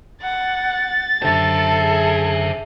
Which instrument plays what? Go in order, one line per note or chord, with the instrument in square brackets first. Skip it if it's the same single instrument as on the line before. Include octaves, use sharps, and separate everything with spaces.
[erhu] F#5 [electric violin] A6
[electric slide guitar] F#2 D3 G4 [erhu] A4 [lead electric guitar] C5 E5
[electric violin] G#4